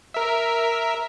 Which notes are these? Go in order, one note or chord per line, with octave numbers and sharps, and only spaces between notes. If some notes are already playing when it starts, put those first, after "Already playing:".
A#4 E5